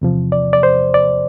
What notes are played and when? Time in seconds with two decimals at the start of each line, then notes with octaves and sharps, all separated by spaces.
0.02 E2 C3 F3
0.32 D5
0.53 D5
0.63 C5
0.94 D5